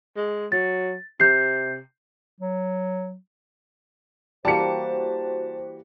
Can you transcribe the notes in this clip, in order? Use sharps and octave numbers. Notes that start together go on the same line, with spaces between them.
G#3
F#3 A6
C3 G6 C7
F#3
E3 G3 A#3 F#4 G4 C5 A5 C#7